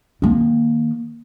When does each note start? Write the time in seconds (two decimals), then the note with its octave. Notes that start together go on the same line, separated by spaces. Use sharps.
0.22 D#3 A#3